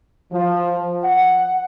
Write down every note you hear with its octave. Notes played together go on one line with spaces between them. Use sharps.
F3
F#5